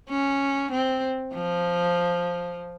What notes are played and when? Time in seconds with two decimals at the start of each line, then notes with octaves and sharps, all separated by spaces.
0.09 C#4
0.71 C4
1.34 F3